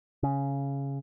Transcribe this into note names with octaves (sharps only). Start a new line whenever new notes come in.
C#3